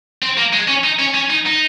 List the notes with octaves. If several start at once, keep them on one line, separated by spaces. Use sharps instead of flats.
C4
A#3
G#3
C#4
D#4
C#4
C#4
D#4
D#4